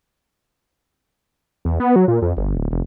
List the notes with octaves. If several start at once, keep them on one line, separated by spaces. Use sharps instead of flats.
E2
B3
F#3
A#2
F2
G1
D1
F1